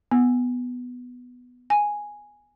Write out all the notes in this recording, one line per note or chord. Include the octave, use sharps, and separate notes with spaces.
B3
G#5